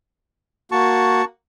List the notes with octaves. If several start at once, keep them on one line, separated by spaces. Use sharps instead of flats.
A#3 F#4 A5 C#6